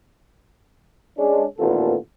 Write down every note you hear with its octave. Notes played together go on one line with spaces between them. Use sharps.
G#3 C#4 D4
A1 D#2 A#2 B3 F4 A4